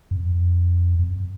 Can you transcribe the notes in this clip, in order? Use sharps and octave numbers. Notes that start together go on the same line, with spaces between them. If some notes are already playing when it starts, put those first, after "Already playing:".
F#2
F2
F2
F#2